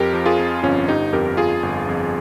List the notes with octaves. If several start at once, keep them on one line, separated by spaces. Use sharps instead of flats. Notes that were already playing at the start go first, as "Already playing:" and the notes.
Already playing: F2 G4 A#4
F3
F4 G#4
F2
G1 C#4 F4
G1 D#4 G4
F2 G4 A#4
F2 F4 G#4
G1
F2